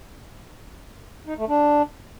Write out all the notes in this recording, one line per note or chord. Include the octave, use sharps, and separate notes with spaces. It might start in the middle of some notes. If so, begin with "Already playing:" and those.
D#4
A3
D4